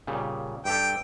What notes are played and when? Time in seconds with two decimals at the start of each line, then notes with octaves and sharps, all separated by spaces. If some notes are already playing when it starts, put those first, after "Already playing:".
0.07 A#2 C#3 G3
0.65 G2 G4 A4 G5